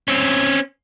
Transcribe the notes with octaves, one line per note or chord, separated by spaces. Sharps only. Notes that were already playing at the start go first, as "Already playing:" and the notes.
C4 C#4